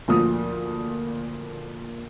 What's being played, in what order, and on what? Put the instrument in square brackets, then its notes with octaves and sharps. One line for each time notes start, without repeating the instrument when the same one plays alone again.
[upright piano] D2 A#2 F3 D#6